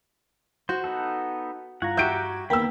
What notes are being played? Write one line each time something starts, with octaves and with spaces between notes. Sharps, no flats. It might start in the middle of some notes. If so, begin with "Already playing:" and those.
F#4 C5
B3 D#4 A4
G2 F4 F#5 A#5 C#6 G#6
F#4 G4 E5 G6 D7
D#3 A#3 B3 A#4 G5 B5 E6